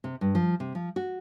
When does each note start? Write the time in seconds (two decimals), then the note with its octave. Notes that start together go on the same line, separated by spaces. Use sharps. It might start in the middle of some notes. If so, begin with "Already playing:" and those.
0.04 C3
0.21 G2
0.35 F3
0.60 C3
0.75 F3
0.96 F#4